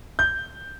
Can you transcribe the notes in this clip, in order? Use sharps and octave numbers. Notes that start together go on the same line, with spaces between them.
G6